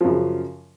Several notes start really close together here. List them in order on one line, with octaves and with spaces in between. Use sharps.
F3 F#2 C#3